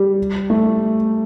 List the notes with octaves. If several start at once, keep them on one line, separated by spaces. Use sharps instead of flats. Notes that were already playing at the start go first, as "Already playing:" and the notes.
Already playing: G3
A3